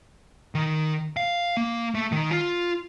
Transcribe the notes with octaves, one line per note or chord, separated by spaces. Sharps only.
D#3
F5
A#3
A3
D#3
F4